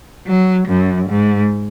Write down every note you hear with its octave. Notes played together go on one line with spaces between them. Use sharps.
F#3
F#2
G#2